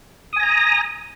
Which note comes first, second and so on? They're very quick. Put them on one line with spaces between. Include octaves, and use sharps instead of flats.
D#6 G#5 A#6 A#5